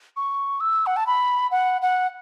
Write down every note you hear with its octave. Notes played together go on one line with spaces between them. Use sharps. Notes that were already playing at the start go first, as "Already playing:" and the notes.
C#6
E6
F#5
A5
B5
F#5
F#5